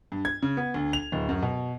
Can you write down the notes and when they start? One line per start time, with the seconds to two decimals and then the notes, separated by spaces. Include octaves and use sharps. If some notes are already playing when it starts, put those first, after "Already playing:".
0.12 G2
0.25 G#6
0.42 C#3
0.57 B3
0.74 D2
0.93 F7
1.12 D1
1.29 F#2
1.42 B2